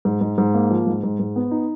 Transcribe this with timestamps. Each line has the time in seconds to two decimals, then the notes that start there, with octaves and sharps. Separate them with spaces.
0.05 G#2
0.21 G#2
0.38 G#2
0.54 A#3
0.71 F3
0.87 G#2
1.03 G#2
1.20 G#2
1.36 B3
1.51 D#4